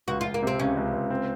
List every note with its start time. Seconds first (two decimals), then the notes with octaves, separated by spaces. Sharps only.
0.08 C#2 F#4
0.21 C#2 F4
0.34 A#3
0.43 C3 C4
0.59 C#2 C#4
0.77 C#2
0.93 C#2
1.10 C4